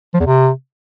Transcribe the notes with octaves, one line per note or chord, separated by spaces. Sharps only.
F3
E2
C3